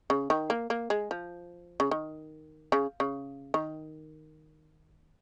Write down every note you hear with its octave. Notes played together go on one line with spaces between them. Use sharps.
C#3
D#3
A#3
A#3
G#3
F3
C#3
D#3
C#3
C#3
D#3